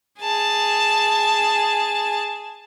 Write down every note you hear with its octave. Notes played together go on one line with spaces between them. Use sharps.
G#4 A5